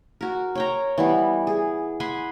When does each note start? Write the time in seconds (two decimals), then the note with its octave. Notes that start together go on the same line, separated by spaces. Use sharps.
0.21 F#4 A#4
0.55 C#5 G5 A#5
0.98 E3 G3 B3
1.47 G#4
2.00 F#5 G#5 B5 C6